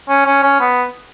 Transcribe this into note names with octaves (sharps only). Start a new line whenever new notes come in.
C#4
C#4
C#4
B3